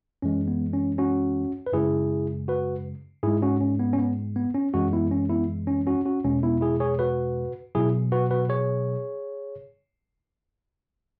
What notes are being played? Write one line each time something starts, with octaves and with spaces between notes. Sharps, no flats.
F#2 E3 G#3 C#4
B3
C#4
C#4 F#4
B4
F#2 C#3 G#3 E4 G#4
F#4 B4
G#2 G#3 E4 G#4
C#4 F#4
C#4
B3
C#4
B3
B3
C#4
F#2 E3 G#3 C#4 F#4
B3 E4
C#4
B3 E4
C#4
C#4 F#4
C#4 F#4
E2 B2 G#3 C#4
B3 E4
E4 G#4
G#4 C#5
F#4 B4
B2 F#3 E4 G#4
F#4 B4
F#4 B4
G#4 C#5